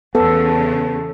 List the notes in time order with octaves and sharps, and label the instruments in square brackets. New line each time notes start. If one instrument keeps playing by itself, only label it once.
[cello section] E2 C#3 [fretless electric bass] B3 [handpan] A4